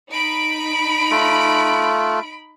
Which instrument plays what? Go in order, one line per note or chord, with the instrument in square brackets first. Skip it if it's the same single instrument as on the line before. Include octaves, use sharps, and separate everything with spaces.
[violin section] D#4 B5 D7
[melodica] A3 F4